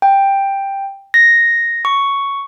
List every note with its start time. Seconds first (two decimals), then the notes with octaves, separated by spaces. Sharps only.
0.02 G5
1.14 A#6
1.85 C#6